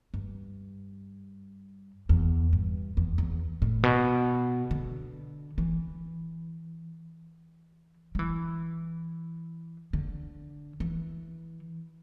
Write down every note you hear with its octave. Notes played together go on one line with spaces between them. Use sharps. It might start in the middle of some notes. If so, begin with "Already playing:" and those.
G2
E2
G2
E2
E2
A2
B2
D3
E3
G3
E3
D3
E3